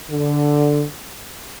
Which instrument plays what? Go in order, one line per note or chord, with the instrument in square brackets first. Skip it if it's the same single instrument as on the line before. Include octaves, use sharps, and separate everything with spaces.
[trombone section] D3